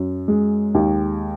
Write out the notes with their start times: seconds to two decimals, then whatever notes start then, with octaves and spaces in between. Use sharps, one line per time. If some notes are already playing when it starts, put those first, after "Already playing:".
Already playing: F#2
0.28 G#3
0.75 D#2